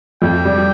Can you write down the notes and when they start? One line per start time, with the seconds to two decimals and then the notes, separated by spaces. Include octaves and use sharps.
0.22 F2 G5
0.45 G3